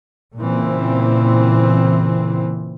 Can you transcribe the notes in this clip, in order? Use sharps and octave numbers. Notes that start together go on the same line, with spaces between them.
A#2 C#3 E3 C4